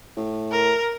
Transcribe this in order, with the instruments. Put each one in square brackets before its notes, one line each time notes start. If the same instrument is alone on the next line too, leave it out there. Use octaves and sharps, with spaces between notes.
[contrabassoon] A2
[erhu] A#4